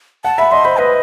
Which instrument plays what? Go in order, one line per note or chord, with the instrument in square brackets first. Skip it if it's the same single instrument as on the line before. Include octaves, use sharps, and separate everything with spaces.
[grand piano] F#5 [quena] A5
[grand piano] E5 [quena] B5
[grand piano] D#5 [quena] C6
[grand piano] C5 [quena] B5
[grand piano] B4 [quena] D#5